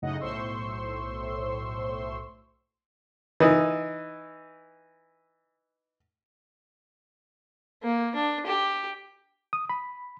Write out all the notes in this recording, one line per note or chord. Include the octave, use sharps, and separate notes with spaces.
F#2 A2 C#3 D#4 D#5 F#5
B1 A2 C5 C6 C#6 E6
E3 D#4
A#3
D4
G4
D#6
B5